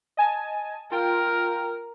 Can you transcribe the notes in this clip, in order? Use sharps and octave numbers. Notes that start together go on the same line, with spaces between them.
D#5 G#5 A5
F4 A#4 G5